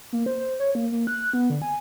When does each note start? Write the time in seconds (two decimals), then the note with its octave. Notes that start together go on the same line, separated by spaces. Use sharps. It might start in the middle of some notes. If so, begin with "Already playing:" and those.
0.13 A#3
0.26 C5
0.39 C5
0.60 C#5
0.75 A#3
0.92 A#3
1.07 F#6
1.33 B3
1.50 D3
1.62 G#5